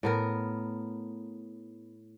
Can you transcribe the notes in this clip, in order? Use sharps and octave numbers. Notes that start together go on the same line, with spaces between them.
A2 B3 A#4